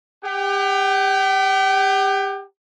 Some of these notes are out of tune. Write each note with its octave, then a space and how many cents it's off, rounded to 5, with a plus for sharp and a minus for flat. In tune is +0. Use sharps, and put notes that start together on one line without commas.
G4 +30 G5 -40